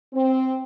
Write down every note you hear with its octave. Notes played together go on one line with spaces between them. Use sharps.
C4